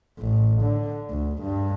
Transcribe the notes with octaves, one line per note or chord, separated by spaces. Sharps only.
A1
D3
D2
G2